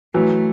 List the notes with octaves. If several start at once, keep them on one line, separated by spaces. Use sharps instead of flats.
E3 F#3 A3